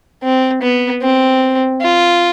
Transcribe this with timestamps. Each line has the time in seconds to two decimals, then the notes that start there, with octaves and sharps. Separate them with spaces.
0.23 C4
0.62 B3
1.02 C4
1.82 F4